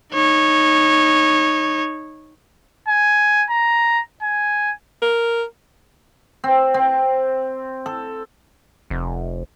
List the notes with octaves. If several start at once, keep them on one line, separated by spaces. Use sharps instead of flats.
D#4 C#5
G#5
A#5
G#5
A#4
C4
C4
A4
F1